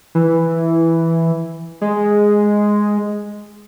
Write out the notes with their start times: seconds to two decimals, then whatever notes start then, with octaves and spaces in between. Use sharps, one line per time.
0.15 E3
1.81 G#3